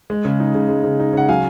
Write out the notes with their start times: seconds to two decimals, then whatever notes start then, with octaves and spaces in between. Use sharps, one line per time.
0.10 G#3
0.25 C#3
0.40 D#4
0.55 C#3
0.69 G#3
0.84 C#3
1.00 D#4
1.13 C#3 F#5
1.29 F#3 F5 G#5